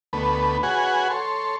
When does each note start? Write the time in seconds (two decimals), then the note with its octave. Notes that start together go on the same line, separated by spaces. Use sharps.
0.13 D2 A3 B3 B4
0.63 F#4 G#4 B4 C#5 F#5 G#5
1.10 A4 C#5 C6